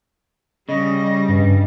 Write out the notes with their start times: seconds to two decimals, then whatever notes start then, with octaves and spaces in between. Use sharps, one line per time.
0.69 C#3 G3 D#5
1.28 G2